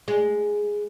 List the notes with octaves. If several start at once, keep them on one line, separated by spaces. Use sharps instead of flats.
G#3